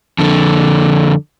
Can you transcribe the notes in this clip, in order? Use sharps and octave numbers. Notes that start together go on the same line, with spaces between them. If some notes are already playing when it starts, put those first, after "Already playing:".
F2 D3